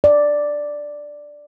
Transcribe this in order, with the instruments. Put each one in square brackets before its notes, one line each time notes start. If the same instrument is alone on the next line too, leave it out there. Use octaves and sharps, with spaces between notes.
[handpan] D5